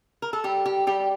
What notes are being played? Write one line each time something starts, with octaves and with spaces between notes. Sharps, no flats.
A#4
A4
G3 G4
G4
G3 G4